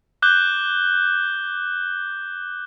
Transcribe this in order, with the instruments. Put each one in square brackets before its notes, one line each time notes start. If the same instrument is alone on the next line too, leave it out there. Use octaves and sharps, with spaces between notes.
[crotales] D6 F#6 G6 G7